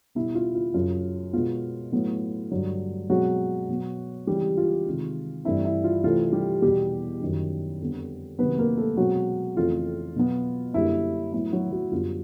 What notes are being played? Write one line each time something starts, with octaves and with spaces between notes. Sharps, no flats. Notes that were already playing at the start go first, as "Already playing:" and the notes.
B2 G3 B3 E4
F4
F4
F#2 C#3 F#3 F4
B2 G#3 B3 F4
A2 F#3 B3
G2 D3 F#3
B2 F#3 G#3 C4 F#4
B2 F#3 B3
C#3 E3 G3 G#3 C4 G4
F4
C3 D#3 G#3
G2 E3 A3 C4 E4
E4
F4
C3 E3 A3 C4 F4
G3 G4
E2 B2 G3 B3 G4
F#2 D#3 G3
F2 D3 G3 B3
C3 D#3 F#3 A#3 B3 B4
A#3 A#4
A3 A4
B2 F#3 G#3 C4 F#4
F2 C#3 E3 A3 C4 F4
B2 F#3 B3
F#2 D3 G3 A#3 E4
A2 F#3 B3 E4
F#3 F#4
F#3 F#4
F#2 D3 G3 B3 F4